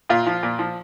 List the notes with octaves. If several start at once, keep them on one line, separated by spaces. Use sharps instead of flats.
A#2 F4
F3
A#2
F3